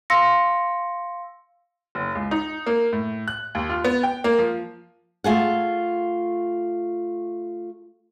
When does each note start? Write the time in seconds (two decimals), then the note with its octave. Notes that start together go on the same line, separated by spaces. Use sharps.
0.10 F5 C6 E6 A#6 C#7
1.95 F#1
2.15 C#2
2.31 D#4
2.66 A#3
2.93 A2
3.28 F#6
3.55 D#2
3.69 F4
3.84 B3
4.03 G5
4.24 A#3
4.39 F3
5.24 A3 F4 G#4 F#5